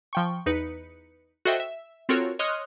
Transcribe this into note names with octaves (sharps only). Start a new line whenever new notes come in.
F3 G5 C#6
E2 D#4 B4 C#7
F#4 A4 C5 D#5 E5 G5
E5
C4 F4 F#4 A4 A#4 C#5
C#5 D#5 C6 D#6 F6 F#6